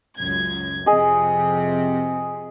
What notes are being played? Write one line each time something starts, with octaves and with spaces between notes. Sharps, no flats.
C#2 F#2 G#6
F2 C3 G#4 D#5